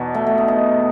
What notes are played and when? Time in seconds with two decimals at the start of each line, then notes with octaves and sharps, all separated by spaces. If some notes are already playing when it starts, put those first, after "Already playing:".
Already playing: E2 B2 B3 D#4
0.15 A3
0.27 A3
0.38 D#4
0.48 D#4